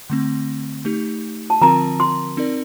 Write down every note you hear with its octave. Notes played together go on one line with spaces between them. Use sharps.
D3 A3 C4
A3 D#4 G4
A5
D3 F3 C4 F4 A#4 A#5
C6
C4 D#4 A#4 D5